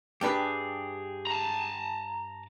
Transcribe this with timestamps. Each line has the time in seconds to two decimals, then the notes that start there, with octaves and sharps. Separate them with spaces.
0.21 G2 D4 G4 G#4 B4
1.27 A5 A#5